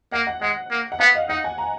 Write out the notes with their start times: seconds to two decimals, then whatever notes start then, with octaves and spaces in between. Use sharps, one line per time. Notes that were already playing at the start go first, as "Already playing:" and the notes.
0.12 A#3 F#5
0.27 F#5
0.41 G#3 F#5
0.71 A#3
0.92 F#5
1.00 B3 F5
1.15 D#5
1.29 D#4 F#5
1.44 G#5
1.58 A#5